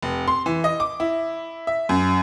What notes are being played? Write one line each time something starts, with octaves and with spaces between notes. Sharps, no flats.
F1
C6
E3
D#5
D6
E4
E5
F#2